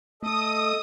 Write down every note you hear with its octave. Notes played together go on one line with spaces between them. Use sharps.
A3 A4 D#5 D#6